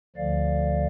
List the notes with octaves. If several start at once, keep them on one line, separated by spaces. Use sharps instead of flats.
D2 D3 F3 D5 F5